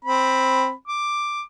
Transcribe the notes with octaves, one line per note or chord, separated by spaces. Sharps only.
C4 B5
D6